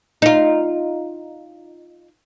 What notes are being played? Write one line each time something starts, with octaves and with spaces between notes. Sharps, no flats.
D#4 F4